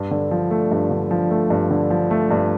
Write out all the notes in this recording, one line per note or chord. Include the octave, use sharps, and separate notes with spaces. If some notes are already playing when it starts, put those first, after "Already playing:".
Already playing: G2
D3
F3
A3
G2
D3
F3
A3
G2
D3
F3
A3
G2